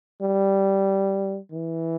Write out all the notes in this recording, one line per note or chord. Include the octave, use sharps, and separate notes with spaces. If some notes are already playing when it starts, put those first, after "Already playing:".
G3
E3